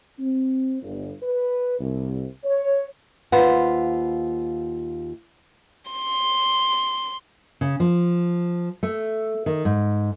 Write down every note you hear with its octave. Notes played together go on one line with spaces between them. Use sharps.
C4
G1
B4
C2
C#5
D#2 F4 B4 C5 F#5
C6
C#3
F3
A3
D#3
G#2